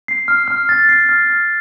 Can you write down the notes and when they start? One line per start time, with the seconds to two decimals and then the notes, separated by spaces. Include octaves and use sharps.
0.08 C7
0.28 F6
0.48 F6
0.69 A6
0.89 C7
1.09 F6
1.30 F6